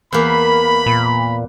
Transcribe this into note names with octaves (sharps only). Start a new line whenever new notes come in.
E2 A#3 B5
A#2